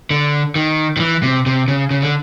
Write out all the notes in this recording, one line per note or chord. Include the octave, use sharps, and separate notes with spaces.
D3
D#3
D#3
E3
C3
C3
C#3
C#3
D3